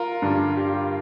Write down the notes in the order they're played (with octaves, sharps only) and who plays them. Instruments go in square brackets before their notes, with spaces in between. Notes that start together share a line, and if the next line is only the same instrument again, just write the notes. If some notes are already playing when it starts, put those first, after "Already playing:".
Already playing: [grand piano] F4 A#4
G2 D3 G3
G4